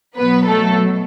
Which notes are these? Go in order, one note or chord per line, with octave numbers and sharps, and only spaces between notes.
B2 F#3 B3 B4
A3 A4